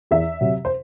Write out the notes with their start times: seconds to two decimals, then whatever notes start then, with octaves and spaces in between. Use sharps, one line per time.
0.11 E2 E5
0.41 C3 F#3
0.65 C5